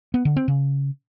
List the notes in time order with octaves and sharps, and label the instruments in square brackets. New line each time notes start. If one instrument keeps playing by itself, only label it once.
[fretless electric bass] B3
D3
C4
C#3